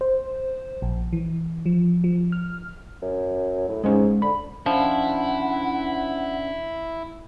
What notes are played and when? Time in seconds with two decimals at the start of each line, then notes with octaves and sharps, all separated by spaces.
0.01 C5
0.82 A#1
1.13 E3
1.66 F3
2.04 F3
2.32 F6
3.02 F#2
3.68 A2
3.84 G#2 G#3 C#4
4.22 D3 B5
4.66 F3 C#4 D4 E4 C5 F#5